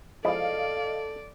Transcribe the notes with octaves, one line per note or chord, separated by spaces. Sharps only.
F3 G#3 E4 A4 D5 D#5 F5